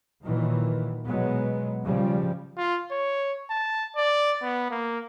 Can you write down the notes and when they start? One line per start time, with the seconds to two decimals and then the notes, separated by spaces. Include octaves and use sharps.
0.24 A#2 D#3 E3 F#3
1.07 B2 F#3 G#3 B3
1.83 C#3 F3 G3
2.57 F4
2.91 C#5
3.50 A5
3.96 D5
4.42 B3
4.71 A#3